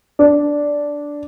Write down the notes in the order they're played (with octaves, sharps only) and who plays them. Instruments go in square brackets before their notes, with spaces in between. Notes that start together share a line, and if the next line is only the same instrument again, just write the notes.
[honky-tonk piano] D4